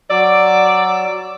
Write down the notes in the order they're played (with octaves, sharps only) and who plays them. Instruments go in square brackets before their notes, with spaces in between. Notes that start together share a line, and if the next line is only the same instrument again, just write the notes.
[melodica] F#3 D6 E6 [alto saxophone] D5